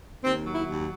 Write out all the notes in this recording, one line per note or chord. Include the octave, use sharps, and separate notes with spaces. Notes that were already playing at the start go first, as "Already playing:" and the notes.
D#2 C4
F#3
E4
D#2